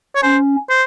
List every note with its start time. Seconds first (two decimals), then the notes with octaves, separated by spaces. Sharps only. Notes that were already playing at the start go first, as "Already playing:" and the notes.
0.16 C#5
0.23 C#4 C5
0.70 C5